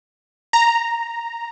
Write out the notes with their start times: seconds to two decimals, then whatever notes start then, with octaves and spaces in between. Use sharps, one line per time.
0.53 A#5